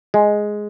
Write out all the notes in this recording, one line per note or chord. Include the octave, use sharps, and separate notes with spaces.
G#3